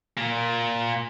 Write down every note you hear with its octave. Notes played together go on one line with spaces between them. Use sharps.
A#2 A#3